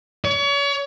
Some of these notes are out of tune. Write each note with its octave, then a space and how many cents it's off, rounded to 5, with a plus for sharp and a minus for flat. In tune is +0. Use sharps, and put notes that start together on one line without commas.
C#5 +35